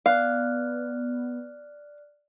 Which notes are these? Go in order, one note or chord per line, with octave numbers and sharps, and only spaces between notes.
B3 D5 F5 F6 F#6